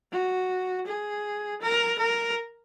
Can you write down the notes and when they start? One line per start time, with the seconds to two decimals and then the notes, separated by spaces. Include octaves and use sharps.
0.12 F#4
0.87 G#4
1.62 A#4
1.99 A#4